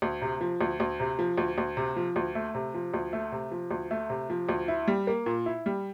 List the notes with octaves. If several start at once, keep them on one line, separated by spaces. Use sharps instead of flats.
D2
C3
F3
D2
D2
C3
F3
D2
D2
C3
F3
D2
A3
C3
F3
D2
A3
C3
F3
D2
A3
C3
F3
D2
E4
G3
A#3
A#2
E4
G3